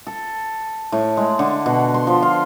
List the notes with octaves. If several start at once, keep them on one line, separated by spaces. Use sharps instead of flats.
A4
A2
G#3
D3
B2
C6
F3
F5